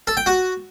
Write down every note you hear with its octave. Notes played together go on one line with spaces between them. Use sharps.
A4
G5
F#4